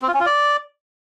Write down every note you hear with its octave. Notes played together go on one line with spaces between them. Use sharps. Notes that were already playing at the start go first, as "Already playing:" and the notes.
C4
F4
C#4
F4
D5